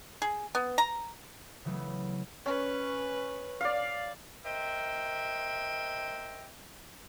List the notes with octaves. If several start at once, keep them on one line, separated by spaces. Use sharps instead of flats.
G#4
B3
A#5
C#3 E3 F#3 A3 B3
C#4 B4
D5 F5
A#4 C5 D#5 E5 G5